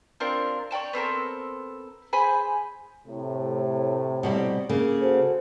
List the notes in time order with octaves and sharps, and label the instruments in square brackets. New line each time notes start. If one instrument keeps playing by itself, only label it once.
[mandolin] C4 D4 F4 A#4
C#5 D5 G5 A5
B3 C4 A4 A#4
G#4 C5 G#5 B5
[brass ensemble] A2 C3
[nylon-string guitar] B2 G3 C4
C#3 A#3
[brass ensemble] F#4 A4 C5